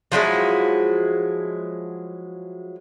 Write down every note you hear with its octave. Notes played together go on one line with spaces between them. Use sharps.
F3 F#3 G#3 E4